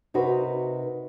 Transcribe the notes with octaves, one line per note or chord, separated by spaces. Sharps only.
C3 D#4 F#4 A#4 B4